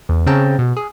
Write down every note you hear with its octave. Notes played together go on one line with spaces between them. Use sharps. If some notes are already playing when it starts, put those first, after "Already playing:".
E2
C#3 C4 C#4 G5 A5 A#5
B2
G#4